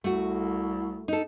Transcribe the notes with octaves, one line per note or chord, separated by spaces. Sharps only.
C2 A3 F#4
D#4 A4